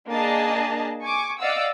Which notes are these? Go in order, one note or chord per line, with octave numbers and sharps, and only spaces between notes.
A#3 D4 G#4 D#5 A5
G#5 C#6 D6
D5 D#5 F5 F#5 E6